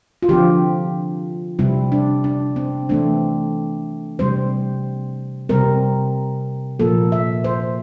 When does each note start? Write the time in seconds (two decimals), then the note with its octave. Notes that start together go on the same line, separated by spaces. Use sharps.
0.23 F4
0.29 D3 F3 C4 G4
1.59 C3 G3 C4 E4
1.92 D4
2.24 D4
2.56 C4
2.89 E3 A3 C4 D4
4.19 C3 G3 C4 C5
5.49 C3 G3 C4 A#4
6.79 A#2 F3 A#3 A4
7.12 E5
7.44 C5